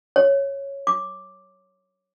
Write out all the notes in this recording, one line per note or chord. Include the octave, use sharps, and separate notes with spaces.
C#5
D6